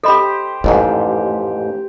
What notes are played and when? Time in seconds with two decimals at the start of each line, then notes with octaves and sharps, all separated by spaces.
0.04 G4 A4 C5 D#5 B5
0.64 A1 F2 G#2 A3